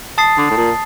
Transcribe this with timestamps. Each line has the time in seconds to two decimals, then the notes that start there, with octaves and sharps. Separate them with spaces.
0.18 A5 D#6 A6 C7
0.38 D3
0.50 A2
0.57 A#2